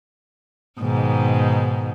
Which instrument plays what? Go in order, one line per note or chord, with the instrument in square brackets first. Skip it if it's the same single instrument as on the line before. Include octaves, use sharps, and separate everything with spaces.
[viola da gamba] G#2 B2 D#3